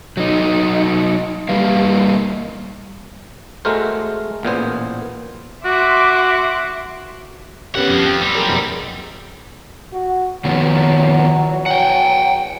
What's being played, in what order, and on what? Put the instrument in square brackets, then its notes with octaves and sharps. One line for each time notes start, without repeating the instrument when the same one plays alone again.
[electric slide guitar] F#3 D#4
G3 A#3 B4 F5
[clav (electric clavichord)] G#3 A3 F#4 A#4 C5
A1 A#2 B3 C5
[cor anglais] F#4 [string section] E5 C6 D6
[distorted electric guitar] D#3 F#5 [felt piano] B3 C#4 G4
[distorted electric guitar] F2 F3
[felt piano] G5
[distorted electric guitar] G3 C4
[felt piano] F#3 A#3 G#4
F1 F#3
[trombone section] F#4
[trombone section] E2 F#3 [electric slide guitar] D#3 F3 B3
[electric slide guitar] F#5 G5